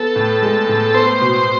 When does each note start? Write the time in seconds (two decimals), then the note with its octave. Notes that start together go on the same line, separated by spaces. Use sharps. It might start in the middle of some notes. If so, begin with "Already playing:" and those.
Already playing: B3 A4
0.16 A2
0.42 G#3
0.69 A2
0.94 B3 C5
1.21 B2